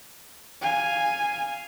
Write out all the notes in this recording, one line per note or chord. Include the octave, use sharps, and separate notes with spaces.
F5 G#5